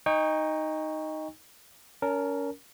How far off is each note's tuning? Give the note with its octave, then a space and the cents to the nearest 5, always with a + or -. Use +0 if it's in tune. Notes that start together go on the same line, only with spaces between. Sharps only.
D#4 +0 G5 +40 C#6 +0
C#4 +30 A#4 +0 A5 +0